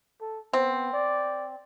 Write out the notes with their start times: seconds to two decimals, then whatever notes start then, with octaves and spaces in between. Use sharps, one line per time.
0.21 A4
0.53 B3 C4
0.93 D5